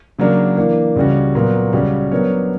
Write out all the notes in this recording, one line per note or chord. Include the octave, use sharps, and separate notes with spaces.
C#3 F#3 A#3 D4 A#4
E3 A#3 D4
C#2 C#3 G3 C#4 F#4
A#2 F#3 B3 F#4
C#2 C#3 G3 C#4 F#4
F#3 B3 D4 A#4 C#5